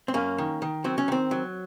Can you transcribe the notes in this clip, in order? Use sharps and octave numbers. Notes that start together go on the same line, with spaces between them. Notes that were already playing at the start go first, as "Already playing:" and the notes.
C4
F#2 A#3 C#4
D#3
D#3
F#3 C4
C#4
D#3 C4
F#3